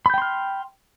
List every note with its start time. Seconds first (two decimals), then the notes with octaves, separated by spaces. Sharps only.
0.06 B5
0.10 G6
0.14 G5
0.18 C6
0.22 F6